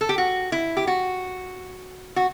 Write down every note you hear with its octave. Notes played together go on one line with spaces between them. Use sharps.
A4
G4
F#4
E4
G4
F#4
F#4